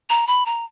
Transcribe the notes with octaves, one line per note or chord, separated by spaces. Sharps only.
A#5
B5
A#5